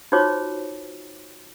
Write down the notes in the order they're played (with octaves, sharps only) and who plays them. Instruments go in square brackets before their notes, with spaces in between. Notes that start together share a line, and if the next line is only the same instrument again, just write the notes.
[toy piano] D#4 F4 F#4 C5 C#5 D6